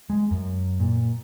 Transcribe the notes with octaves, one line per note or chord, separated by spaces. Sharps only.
G#3
F#2
A#2